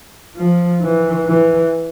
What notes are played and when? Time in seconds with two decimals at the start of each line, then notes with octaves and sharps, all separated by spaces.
0.36 F3
0.81 E3
1.26 E3